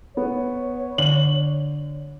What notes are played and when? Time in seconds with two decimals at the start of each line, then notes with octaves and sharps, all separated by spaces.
0.17 B3 C#5
0.98 D3 F#7